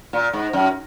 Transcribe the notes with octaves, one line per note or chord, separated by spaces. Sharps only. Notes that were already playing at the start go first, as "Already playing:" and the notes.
A#2
G#2
F#2